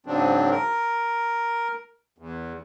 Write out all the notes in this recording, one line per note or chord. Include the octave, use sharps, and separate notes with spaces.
G#2 C#3 F#3 C4 D4
A#4
E2